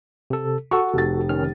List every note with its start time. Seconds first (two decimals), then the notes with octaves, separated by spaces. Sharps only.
0.30 C3 A4
0.71 F#4 A4 F#5 C#6
0.94 F1 A6
1.29 D#3 C#4 F6